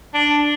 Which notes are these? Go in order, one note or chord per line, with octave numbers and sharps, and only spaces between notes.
D4